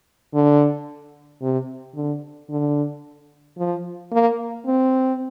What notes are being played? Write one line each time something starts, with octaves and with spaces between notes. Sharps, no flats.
D3
C3
D3
D3
F3
A#3
C4